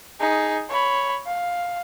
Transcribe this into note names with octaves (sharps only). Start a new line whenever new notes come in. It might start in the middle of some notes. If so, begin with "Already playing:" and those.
D#4 G#4
C#5 B5
F5